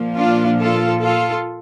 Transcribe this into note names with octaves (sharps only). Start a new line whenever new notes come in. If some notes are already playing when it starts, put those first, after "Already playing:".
Already playing: A#2 F3 A#3
D4 F4
F4 A4
F4 A4